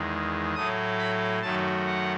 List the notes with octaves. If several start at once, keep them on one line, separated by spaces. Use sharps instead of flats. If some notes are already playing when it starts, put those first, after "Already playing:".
Already playing: E2 D#3 G#3
A2 F#3 A3 D#6
B5
F#2 D#3 F#3 A3 A5
F#5